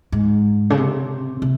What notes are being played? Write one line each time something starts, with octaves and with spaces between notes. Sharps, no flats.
G#2
C#3
C3
C3